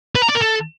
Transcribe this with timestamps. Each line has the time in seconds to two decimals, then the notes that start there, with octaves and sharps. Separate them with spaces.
0.15 B4
0.22 A#5
0.29 D5
0.35 A#4
0.42 A4